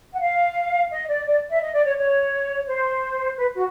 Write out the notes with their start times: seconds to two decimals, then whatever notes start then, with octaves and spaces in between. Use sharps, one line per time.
0.12 F#5
0.20 F5
0.90 D#5
1.08 D5
1.26 D5
1.49 E5
1.61 D#5
1.72 D5
1.84 C#5
1.95 C#5
2.66 C5
3.37 B4
3.55 F#4